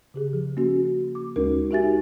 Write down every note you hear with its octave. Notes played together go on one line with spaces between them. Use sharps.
C#3 G4 G#4
F3
A#3 C#4 F#4
D6
D2 G#3 C#4 D#4 F#4 A#4
D#4 F#4 G4 E5 G#5 A6